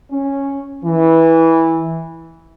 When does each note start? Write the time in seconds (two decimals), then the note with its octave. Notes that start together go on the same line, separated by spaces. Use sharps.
0.11 C#4
0.84 E3